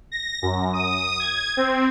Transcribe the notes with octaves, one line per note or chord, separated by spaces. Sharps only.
A#6
F#2
D#6
G#6
C4